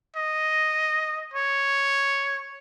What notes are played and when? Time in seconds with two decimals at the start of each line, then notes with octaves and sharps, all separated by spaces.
0.16 D#5
1.34 C#5